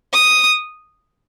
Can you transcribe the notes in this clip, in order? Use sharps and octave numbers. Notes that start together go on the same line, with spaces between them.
D#6